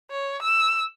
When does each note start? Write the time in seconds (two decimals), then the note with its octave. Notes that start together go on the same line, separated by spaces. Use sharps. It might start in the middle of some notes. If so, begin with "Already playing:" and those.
0.11 C#5
0.42 E6